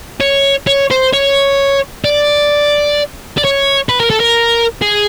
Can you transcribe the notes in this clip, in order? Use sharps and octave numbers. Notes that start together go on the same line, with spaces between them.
C#5
C#5
C5
C#5
D5
D5
C#5
B4
A#4
A4
A#4
G#4